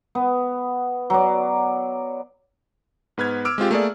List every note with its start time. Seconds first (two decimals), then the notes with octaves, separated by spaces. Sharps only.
0.15 B3
1.10 F#3 D5
3.18 G#2 B3 B4 F6 G#6
3.45 D6 E6 F6 D7
3.58 G#3 C4 F4 G4
3.71 A3 A#3 G#4 D5